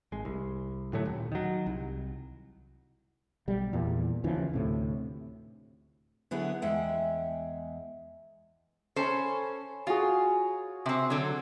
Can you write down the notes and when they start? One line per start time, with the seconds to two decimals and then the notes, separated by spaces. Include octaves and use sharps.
0.12 G#1 G#3
0.25 C2
0.93 A2 D3 F#3 A3
1.06 D#1
1.32 D#3 F#3
1.66 C2
3.48 B1 G3
3.73 E2 A#2
4.24 D#2 C#3 E3 F3
4.53 D2 A2 C3
6.31 D3 F#3 B3 E4 G#4
6.62 E2 G#3 E5 F#5 G5
8.96 C#4 A4 C5 C#5 G#5 B5
9.87 F4 F#4 G#4
10.86 C3 C4
11.10 D3 F#3